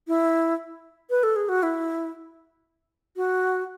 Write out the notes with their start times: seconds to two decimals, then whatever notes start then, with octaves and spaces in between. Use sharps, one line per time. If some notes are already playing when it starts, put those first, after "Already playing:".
0.08 E4
1.10 B4
1.23 A4
1.36 G#4
1.49 F#4
1.63 E4
3.16 F#4